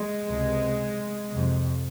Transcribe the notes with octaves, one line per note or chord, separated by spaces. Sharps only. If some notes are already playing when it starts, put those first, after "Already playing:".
Already playing: G#3
C#2 C3
F2 C3